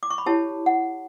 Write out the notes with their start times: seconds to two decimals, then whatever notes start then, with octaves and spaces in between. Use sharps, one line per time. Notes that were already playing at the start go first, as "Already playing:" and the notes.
0.03 D6
0.10 C#6
0.18 B5
0.26 E4 G4 C#5 A5
0.66 F#5